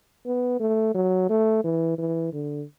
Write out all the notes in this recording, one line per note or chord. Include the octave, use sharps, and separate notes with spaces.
B3
A3
F#3
A3
E3
E3
D3